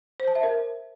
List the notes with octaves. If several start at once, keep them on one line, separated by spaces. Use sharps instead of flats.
C5
A5
E5
A#4